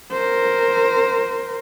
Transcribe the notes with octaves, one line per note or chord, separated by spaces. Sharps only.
A#4 C5